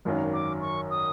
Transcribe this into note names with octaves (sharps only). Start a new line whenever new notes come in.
G#1 F#2 D#3 F#3
D6
C#6
D#6